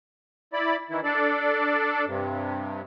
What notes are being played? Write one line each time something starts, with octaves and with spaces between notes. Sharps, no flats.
E4 D5 B5
D#3 E3 E4
D4 A4 D5
G2 C3